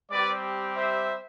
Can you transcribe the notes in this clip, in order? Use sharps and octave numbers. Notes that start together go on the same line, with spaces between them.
G3 C4 G4 B4 D5
C5 E5